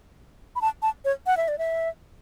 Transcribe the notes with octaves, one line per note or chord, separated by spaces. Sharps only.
B5
A5
A5
C#5
F#5
E5
D5
E5